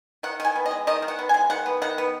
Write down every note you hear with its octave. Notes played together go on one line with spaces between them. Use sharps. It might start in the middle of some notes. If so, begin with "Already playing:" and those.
D#3 F#5
D#3 G#5
B3
D#5
G#3
D#3 D#5
D#3
F#5
B3
G#3 G#5
D#3 F#5
B3
D#3 F#5
B3